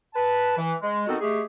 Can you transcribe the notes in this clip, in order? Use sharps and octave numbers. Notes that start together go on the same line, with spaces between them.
B4 A5
E3
G#3
D#3 B3 C4 D#4 F#4 A4
G#3 A3 G4 G#4